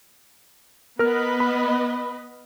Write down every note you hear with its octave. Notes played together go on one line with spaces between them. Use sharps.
B3 A#4 B4 D#5 F6
B5